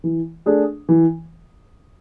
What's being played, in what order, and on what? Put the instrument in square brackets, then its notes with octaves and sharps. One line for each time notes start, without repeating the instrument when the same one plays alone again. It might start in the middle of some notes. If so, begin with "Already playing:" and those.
[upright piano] E3
A3 D4 G#4
E3